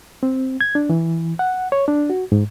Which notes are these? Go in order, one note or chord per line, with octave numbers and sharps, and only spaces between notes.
C4
G#6
D4
E3
F#5
C#5
D4
F#4
G#2